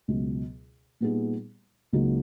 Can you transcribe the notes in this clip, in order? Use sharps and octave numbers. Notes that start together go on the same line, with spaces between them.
C#2 B2 F#3
A#2 G3 B3 D#4 G#4
C#2 C#3 F#3 A#3 D#4